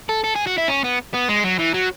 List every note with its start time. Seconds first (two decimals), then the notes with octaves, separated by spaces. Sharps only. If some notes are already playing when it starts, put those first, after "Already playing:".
0.09 A4
0.24 A4
0.35 G#4
0.47 F#4
0.58 E4
0.68 C#4
0.84 B3
1.14 B3
1.29 G#3
1.44 F#3
1.59 E3
1.74 F#3